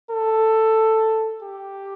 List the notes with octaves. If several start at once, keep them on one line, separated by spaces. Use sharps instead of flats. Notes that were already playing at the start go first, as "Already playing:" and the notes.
A4
G4